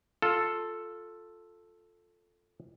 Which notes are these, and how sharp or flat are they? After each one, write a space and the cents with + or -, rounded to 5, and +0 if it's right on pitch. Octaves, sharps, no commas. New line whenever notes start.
F4 +10 A4 +0